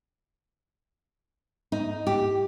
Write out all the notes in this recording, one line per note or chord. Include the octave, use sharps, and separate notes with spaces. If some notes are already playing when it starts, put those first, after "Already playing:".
D#4
G4